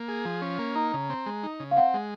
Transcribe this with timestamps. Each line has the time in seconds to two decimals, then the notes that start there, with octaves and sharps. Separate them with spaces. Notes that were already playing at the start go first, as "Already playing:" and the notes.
Already playing: A#3
0.08 G#4
0.25 F3
0.42 C#4
0.59 A#3
0.75 D#4 A#5
0.93 C#3
1.10 C4
1.26 G#3
1.43 D#4
1.60 C#3
1.71 F5
1.77 C4 F#5
1.94 G#3